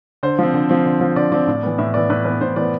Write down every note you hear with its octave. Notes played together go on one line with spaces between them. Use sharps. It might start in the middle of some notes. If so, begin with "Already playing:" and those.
D3 C5
F3 C4
D3
F3 C4
D3
F3 C4
D3 D5
F3 C4 D5
A2
E3 B3
A2 E5
E3 B3 D5
A2 B4
E3 B3 B4
A2 C5
E3 B3 D5